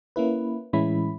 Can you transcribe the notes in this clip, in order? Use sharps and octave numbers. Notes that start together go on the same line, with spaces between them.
A#3 C#4 E4 B4
A2 E3 G#3 C#4 E4 B5